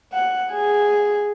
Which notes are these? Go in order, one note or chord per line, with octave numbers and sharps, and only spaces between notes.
F#5
G#4